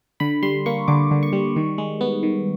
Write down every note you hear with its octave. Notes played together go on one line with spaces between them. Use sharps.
D3 B5
G3 C6
A#3 C#6
D3 D6
D3
C#6
G3
D#3
G#3
B3
D#3